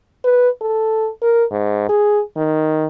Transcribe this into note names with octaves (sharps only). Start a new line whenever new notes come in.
B4
A4
A#4
G#2
G#4
D#3